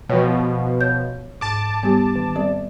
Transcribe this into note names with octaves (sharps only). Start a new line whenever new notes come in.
B2 F3 C#5 G5
C#5 G6
G#2 A5 D6
G3 B3 G4
D#3
G3 C4 D5